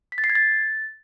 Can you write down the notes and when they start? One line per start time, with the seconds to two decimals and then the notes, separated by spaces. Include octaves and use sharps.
0.12 B6
0.18 A6
0.24 C7
0.30 G#6
0.35 A6